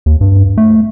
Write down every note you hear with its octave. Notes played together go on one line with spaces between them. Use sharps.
D#2
G2
A3